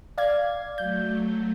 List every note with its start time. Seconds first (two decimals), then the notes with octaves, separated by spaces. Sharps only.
0.18 D5 F5 G#6
0.78 F#3 A3 G6